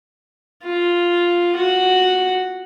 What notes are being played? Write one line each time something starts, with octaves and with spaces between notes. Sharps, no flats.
F4
F#4